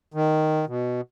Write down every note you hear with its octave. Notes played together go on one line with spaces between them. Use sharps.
D#3
B2